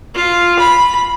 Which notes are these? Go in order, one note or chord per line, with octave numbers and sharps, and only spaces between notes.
F4
B5